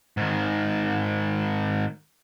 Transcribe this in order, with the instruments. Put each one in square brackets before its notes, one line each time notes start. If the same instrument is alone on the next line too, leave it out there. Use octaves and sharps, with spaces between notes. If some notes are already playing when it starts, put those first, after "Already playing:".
[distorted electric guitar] G#2 D#3